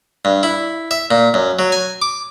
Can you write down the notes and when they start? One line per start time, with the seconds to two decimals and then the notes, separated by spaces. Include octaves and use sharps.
0.25 G2
0.43 E4
0.91 E5
1.11 A#2
1.34 F#2
1.59 F#3
1.72 G#5
2.02 D6